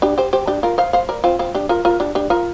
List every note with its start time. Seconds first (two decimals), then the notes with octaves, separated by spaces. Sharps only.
0.02 D4 G4
0.18 G4 C5
0.33 G4 C5
0.47 D4 G4
0.63 F4 A#4
0.78 C5 F5
0.93 C5 F5
1.09 A#4 D5
1.24 C4 F4
1.39 C4 F4
1.54 D4 G4
1.69 F4 A#4
1.85 F4 A#4
2.00 D4 G4
2.15 D4 G4
2.30 F4 A#4